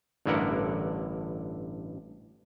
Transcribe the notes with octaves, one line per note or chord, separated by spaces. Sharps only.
A1 G2 D3 E4 A#4 F#5